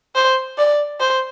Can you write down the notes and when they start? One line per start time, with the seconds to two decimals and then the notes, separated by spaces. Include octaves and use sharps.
0.15 C5
0.58 D5
1.00 C5